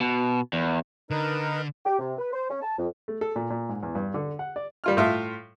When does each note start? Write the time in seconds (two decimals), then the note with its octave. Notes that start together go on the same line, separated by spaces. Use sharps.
0.01 B2
0.53 E2
1.10 D3 D#4 A#4 B4
1.85 G4
1.99 C3
2.18 B4
2.33 C5
2.50 C#4
2.62 A5
2.78 F2
3.08 A3
3.21 A4
3.36 A#2
3.50 A#2
3.69 G#2
3.83 E2
3.95 G2
4.14 D3
4.39 F#5
4.56 D5
4.84 G3 F4 F6
4.97 A2 F4 E5